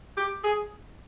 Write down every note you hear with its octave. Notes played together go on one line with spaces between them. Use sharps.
G4
G#4